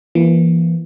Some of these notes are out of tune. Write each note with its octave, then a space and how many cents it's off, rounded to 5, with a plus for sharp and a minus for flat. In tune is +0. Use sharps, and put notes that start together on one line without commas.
E3 +30 A#3 +25